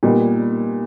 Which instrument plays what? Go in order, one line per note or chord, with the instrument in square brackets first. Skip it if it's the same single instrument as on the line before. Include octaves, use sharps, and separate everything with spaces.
[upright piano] A#2 G3 B3 D#4